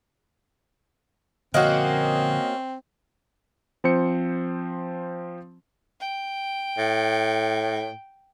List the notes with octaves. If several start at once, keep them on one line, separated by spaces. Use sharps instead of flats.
D3 F3 A#3 C4 C#4 F#4 D#5
F3 C4 C5 C#7
G5
A2